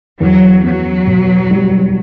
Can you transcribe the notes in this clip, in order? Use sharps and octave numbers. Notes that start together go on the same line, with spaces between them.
E2 F#3
F#3 B3
B2
G3